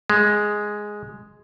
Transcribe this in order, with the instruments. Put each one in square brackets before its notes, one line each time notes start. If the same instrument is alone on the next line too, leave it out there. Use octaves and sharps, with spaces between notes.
[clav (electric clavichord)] G#3